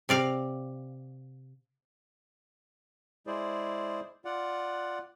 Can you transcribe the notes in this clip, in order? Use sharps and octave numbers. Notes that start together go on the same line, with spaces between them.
C3 D5 F5
G#3 E4 G#4 C5 D5
F4 D5 F#5